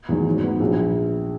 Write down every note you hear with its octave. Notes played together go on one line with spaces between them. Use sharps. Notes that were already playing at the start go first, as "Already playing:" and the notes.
E2 D#3 F#3
G#2
F#3 B3
A#1